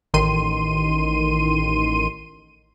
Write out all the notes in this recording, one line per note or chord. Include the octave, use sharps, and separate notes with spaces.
A1 D#3 C6 D#7